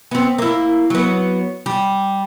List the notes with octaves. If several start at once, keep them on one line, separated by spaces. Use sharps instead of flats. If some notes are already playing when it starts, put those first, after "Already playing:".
B3 C4
A#3 E4
F#3 B3
G3